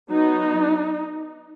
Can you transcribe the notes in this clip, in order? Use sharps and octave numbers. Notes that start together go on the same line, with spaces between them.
F#3 B3 D#4